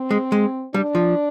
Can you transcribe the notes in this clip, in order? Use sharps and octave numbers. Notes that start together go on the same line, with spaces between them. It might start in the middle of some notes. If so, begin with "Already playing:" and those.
Already playing: C4
G#3
G#3
G3 D4
F3